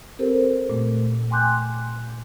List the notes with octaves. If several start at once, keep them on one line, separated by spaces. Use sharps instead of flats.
C4 G4 A4 A#4 C5
A#2 A3
G5 G#5 C6 D6 F#6 G6